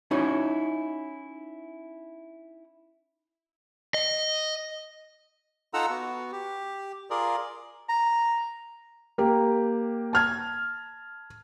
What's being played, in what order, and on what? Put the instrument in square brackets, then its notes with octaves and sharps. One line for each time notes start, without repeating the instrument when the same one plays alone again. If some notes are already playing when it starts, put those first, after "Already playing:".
[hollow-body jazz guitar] C#4 D#4 E4 F#4 C#5
[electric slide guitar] D#5
[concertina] D#4 F4 A4 F#5 A#5 E6
B3 F#4
G4
F4 G#4 A#4 D5
[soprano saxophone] A#5
[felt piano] A#3 G4
A5 F6 G#6